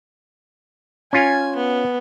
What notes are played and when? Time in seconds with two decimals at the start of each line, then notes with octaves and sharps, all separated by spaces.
1.13 C#4 F4 G#5
1.56 B3